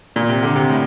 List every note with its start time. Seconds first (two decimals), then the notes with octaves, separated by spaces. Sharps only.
0.16 A#2
0.29 C3
0.43 D3
0.56 C3
0.70 A2